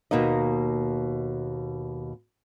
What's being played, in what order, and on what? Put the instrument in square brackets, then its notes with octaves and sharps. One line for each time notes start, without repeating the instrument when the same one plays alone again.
[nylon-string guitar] D#2 B2 A#3 D#4 D#5